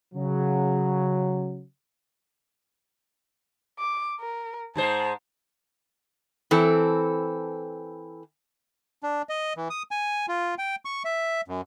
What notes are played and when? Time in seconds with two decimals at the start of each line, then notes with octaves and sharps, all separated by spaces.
0.15 C#3 F#3
3.79 D6
4.20 A#4
4.76 G#2 G#3 C5 A5
6.51 E3 C4 A4
9.03 D4
9.29 D#5
9.57 E3
9.70 D#6
9.91 G#5
10.28 F4
10.58 G5
10.85 C#6
11.05 E5
11.48 F#2